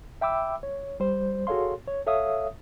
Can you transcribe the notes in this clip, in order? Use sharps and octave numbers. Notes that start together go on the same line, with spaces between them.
E5 G5 B5 D6 E6
C#5
G3 C5
F#4 G#4 A4 C#5 F5 C6
C#5
A4 C#5 E5 F5 D#6